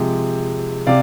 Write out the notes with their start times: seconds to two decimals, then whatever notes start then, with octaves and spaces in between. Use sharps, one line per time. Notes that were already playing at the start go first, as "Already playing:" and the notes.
Already playing: C3 F3 G#3
0.87 C3 D5 F5